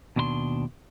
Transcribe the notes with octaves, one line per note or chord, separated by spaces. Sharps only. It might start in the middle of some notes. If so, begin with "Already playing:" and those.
D#2 B2 D4 E4 C6